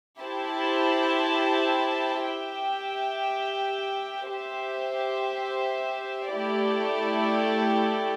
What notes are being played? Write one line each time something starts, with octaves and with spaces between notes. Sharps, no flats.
E4 G4 C5 E5 A5
G4 E5 G5
G4 C5 E5
A3 E4 G4 D5